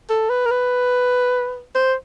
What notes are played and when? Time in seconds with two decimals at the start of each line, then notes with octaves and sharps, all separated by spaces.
0.10 A4
0.30 B4
0.46 A#4
0.51 B4
1.75 C5